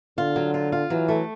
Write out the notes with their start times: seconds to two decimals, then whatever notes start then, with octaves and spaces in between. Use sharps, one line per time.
0.18 D3 F4
0.36 F#3
0.54 F4
0.72 F4
0.90 E3 F#3
1.09 A3